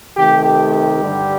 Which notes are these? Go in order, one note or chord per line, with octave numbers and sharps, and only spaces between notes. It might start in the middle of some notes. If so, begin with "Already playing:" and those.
C3 D#3 A3 G4
G4
G4
G2 D3 G3